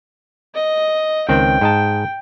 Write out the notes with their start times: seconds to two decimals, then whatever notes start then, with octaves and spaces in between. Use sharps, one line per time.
0.55 D#5
1.29 C#2 D#3 C4 G5
1.61 G#2 D#5 A5